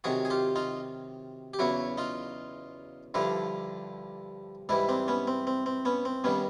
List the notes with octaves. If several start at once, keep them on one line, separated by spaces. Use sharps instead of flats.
C3 D#3 F#3 F#4 G#4
G#4
F4 G4
D#4 F4
G4
E2 C#3 F#3 E4 F#4
D#4 F4
G2 D3 F3 D4 E4
G#2 E3 G3 D4 E4
C4 D4
B3 C#4
C4
C4
C4
B3 C#4
C4
G2 D#3 G3 B3 C#4